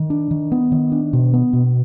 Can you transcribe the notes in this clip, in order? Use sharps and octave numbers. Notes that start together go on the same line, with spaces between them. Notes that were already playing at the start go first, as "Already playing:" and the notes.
Already playing: D#3
D4
D#3
B3
D#3
D4
B2
B3
B2